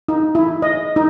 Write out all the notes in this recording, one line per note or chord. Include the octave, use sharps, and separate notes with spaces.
D#4
E4
D#5
D#4